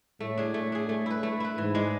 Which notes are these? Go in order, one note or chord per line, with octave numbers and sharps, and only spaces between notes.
A2 A3
D4 G#4
A2 A3
D4 G#4
A2 A3
E4 B4
A3
E4 B4
G#2 E3
G#3 D4